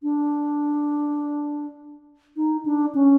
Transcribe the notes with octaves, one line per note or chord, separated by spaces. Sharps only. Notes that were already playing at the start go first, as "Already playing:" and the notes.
D4
D#4
D4
C#4